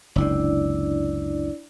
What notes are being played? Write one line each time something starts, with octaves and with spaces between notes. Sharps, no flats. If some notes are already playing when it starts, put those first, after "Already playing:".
F#1 C#2 C3 D4 E4 D5